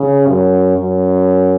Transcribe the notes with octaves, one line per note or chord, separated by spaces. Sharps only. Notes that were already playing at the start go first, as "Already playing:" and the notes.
Already playing: C#3
F#2
F#2